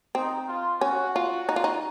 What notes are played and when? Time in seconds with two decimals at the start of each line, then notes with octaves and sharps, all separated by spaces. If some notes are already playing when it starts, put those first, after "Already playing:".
0.15 C4 D#4
0.48 F4
0.81 C#4 F#4
1.16 F4
1.49 D#4
1.56 F4
1.64 D#4